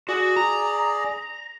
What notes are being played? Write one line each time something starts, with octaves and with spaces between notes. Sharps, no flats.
F#4 G#4 D5
A#5